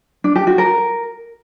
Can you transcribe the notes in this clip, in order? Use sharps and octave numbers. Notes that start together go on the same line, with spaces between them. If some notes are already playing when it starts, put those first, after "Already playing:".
D4
G4
F#4
A#4